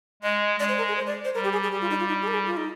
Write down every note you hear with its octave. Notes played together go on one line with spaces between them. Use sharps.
G#3 D#5
G#3 D5
C5
A#4
G#4
C5
D5
C5
G3 A#4
G4
G#4
G#4
G3 G4
F4
D#4
F4
D#4
G#4
A#4
G#4
F4
D#4